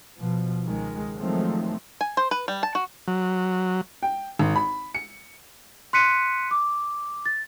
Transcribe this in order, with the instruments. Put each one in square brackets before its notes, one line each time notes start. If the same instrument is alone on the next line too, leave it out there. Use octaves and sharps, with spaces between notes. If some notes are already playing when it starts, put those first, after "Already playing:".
[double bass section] B2 F3
C#2 D#3 G#3
D#3 F3 F#3 G#3 A3 C4
[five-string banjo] G#5
C5
B4
G3
A5
F#4
[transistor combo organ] F#3
[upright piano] G5
G#1
B5
C#7
[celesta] C6 F#6 B6 C#7 D#7
D6
A6